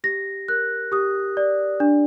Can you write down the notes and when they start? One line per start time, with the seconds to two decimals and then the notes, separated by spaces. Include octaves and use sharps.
0.04 G4 A#6
0.48 A#4 F#6
0.92 G4 D#6
1.37 D5
1.80 D4